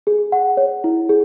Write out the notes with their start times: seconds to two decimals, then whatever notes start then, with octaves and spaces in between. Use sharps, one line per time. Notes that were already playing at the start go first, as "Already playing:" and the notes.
0.07 G#4
0.32 F#5
0.57 C#5
0.84 E4
1.09 G#4